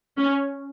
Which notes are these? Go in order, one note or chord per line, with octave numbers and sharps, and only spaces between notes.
C#4